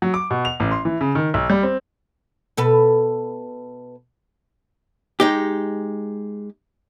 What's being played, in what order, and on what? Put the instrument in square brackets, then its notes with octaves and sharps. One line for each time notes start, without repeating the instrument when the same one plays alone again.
[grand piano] F#3
D6
B2
F7
A1
C6
E3
C#3
D#3
B1
G3
C4
[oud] B2 A4 B4
[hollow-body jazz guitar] G#3 D#4 G4